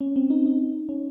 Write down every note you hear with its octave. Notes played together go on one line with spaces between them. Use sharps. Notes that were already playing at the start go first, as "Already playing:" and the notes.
C#4
C4
D#4
D#4
C#4